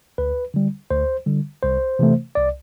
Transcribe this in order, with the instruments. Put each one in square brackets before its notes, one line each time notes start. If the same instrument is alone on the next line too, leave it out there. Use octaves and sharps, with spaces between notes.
[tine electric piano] D2 B4
D3 G3
D2 C5
D3 G3
C2 C5
C3 E3 A3
C2 D5